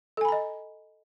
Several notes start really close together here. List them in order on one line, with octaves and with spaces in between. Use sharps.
A4 G#5 B5 A#5 D#5